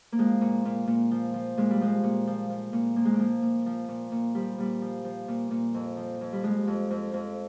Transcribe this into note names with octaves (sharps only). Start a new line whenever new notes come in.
A#3
F3 G#3
A#2
A#2
A#2
F3
F3
A#2 G#3
G3
F3 G#3
A#2
F3
F3
A#2
F3 A#3
G#3
A#3
F3
A#2
F3
A#2
A#2
F3 G3
A#2 G3
F3
F3
A#2
A#2
F2
F3
F2
G3
F3 G#3
F2
F2
F2